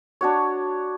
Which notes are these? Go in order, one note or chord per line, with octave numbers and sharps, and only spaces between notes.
D4 F#4 C#5